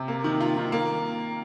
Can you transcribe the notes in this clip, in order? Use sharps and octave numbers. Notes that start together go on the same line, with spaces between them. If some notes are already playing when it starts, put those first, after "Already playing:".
Already playing: C3
A#3
D#3
F4
D#3
A#3